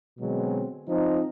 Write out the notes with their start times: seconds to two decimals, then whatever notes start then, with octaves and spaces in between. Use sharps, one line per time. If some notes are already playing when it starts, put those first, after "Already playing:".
0.20 B2 D3 F#3 G#3 C4
0.89 F3 C4 D#4